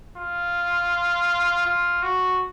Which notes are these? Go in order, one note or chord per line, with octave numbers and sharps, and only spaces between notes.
F4
F4
F#4